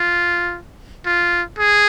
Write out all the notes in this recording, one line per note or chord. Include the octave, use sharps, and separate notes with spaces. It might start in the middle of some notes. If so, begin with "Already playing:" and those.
Already playing: F4
F4
G#4